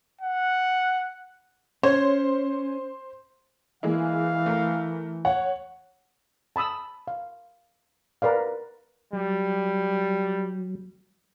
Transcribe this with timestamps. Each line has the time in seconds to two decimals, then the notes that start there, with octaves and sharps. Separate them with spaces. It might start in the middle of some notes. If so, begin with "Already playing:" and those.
0.21 F#5
1.83 C#4 C5 C#5
3.83 E3 G#3 A#3 E4 F5
4.46 A3 A#4
5.25 C#5 F#5
6.56 A5 B5 D#6 E6
7.08 F5
8.22 A#4 B4 D5 F5
9.13 F#3 G3